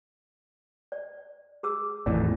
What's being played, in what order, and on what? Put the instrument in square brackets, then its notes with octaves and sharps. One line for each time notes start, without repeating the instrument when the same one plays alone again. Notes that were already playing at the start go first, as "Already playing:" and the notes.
[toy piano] D5
G#4 D6 E6
[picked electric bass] G#1 E2 A2 [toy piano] D5